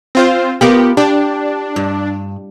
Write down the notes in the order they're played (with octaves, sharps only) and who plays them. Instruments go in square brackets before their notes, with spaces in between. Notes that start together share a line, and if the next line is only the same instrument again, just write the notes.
[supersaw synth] C4 F4 C5
[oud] B3 F4 A#4 [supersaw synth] G4
[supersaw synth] D4 [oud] G4
[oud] G2